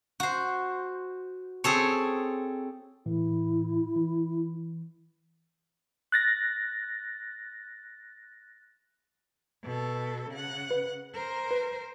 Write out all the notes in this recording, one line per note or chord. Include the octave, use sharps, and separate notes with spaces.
F#4 C5
C4 G#4 A4 C#5
A2 E3 E4
E3
F#6 A6 A#6
B2 A4
C#3 F#5
B4
A#4 C5
B4